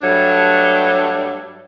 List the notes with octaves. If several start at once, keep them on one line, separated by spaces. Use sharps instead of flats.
G2 F#3 G3 A3 D4